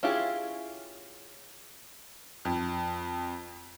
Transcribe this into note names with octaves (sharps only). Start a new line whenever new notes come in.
C#4 E4 F4 G4 G#4
F2